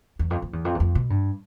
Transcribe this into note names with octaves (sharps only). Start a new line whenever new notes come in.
E2
F2
F2
E2
F2
E2
F2
B2
G2